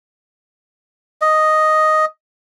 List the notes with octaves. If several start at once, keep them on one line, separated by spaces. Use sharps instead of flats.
D#5